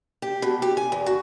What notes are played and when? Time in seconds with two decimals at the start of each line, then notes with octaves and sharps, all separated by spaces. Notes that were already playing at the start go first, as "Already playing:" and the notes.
0.22 G4
0.42 B2
0.62 G4
0.77 G#5
0.92 E2
1.06 F#4